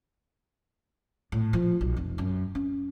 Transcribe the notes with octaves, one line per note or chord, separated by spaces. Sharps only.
A2
F3
B1
F1
F#2
C#4